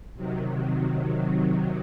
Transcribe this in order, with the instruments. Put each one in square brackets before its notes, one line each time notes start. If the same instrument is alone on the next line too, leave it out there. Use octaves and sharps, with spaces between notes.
[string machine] C3 D#3 F#3